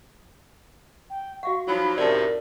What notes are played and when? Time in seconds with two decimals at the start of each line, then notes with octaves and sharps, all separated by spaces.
1.10 G5
1.43 F#4 F5 F#5 C#6
1.67 F3 F#3 D#4 E4 B5
1.97 F#2 A2 C3 A#4 D5 A5